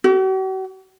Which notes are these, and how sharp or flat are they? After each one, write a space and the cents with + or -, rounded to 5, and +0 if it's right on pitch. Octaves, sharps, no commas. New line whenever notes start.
F#4 +45